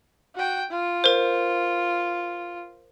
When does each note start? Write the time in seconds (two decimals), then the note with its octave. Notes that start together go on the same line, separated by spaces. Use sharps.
0.35 F#4 G5
0.70 F4
1.04 A#4 C5